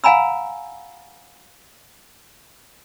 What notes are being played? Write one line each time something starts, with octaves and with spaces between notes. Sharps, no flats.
F5 F#5 G#5 A#5 B5 E6